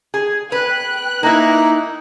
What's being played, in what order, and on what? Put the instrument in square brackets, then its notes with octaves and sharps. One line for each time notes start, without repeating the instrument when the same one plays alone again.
[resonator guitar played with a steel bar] G#4
[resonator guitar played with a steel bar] B4 [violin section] G5 F#6
[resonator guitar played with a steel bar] A#3 E4 [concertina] D#4